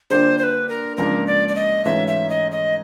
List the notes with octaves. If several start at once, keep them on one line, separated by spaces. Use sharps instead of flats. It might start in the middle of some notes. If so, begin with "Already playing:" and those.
D3 G3 A#3 D4 F4 C5
C5
B4
A#4
C#2 C#3 F3 A#3 D4 A#4
D5
D5
D#5
G#2 E3 A3 C#4 F4 E5
E5
D#5
D#5